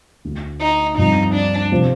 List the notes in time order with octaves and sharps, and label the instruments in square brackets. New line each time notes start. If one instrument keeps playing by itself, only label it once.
[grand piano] D2 D3 A3
[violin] D#4
[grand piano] G2 F3 C4 [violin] D#4
[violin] D4
[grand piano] C3 F3 C4